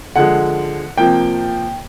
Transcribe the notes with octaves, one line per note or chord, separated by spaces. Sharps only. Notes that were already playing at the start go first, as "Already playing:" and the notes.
D3 F3 G#3 F#5
C3 F3 A#3 G5